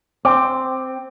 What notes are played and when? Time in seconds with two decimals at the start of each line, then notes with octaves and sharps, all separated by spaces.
0.25 C4 D6